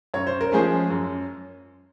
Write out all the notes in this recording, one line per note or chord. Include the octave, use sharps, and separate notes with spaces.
F#2 C#5
C5
A#4
F3 G#3 C#4 G#4 C5
F#2